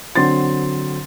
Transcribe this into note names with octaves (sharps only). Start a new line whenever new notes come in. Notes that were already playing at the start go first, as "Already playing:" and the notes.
D3 F#3 C4 C6 A6